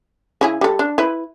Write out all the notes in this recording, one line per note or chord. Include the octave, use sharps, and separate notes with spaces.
C#3 E4 G#4
G3 A4
D4
E4 B4